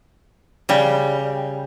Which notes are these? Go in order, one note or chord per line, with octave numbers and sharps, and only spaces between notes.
C#3 G3